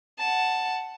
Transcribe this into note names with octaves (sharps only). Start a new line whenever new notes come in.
F#5 A5